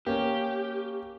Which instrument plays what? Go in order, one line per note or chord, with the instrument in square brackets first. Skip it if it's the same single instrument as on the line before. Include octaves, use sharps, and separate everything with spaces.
[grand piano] A#3 C#4 [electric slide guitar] G4